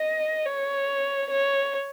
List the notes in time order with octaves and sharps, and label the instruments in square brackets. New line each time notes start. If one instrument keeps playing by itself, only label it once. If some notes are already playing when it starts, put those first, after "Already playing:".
Already playing: [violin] D#5
C#5
C#5